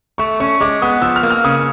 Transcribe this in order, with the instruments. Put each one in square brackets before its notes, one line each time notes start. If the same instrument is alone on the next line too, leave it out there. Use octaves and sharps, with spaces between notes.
[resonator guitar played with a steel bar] A3 [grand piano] C#6
[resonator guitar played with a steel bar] C#4 [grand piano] C#6
[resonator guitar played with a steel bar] G#3 [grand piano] D6
[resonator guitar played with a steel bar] B3 [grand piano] D#6
[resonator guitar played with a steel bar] F3 [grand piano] E6
[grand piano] F6
[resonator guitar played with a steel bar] A#3
[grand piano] F6
[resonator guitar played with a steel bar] C#3 [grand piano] D#6